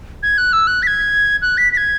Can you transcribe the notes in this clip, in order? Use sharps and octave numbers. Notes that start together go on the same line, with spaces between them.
G#6
F#6
E6
F#6
B6
G#6
F#6
B6
B6
G#6